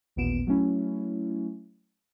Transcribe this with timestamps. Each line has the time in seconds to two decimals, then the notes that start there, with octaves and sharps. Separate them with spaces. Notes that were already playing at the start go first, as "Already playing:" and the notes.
0.16 A1 D#2 A#2 B3 D7 E7
0.47 F#3 A3 C#4 E4